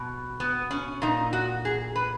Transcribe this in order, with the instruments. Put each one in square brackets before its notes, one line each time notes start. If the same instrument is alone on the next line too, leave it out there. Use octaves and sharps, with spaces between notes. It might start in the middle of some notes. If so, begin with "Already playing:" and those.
Already playing: [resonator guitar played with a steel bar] B2
B3
C#4
A#2 D#4
F#4
G#4
B4